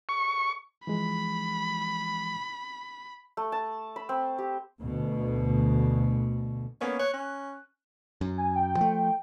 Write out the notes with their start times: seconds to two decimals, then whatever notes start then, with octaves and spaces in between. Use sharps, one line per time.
0.09 C#6
0.87 E3 F3 G#3 B5
3.37 A3
3.52 A5
3.96 B5
4.09 C4
4.38 G4
4.81 D2 B2
6.81 A#3 B3 C#4 C#5
6.99 C#5 F#6
7.14 C#4
8.21 F#2
8.38 G#5
8.56 G5
8.77 F3 A3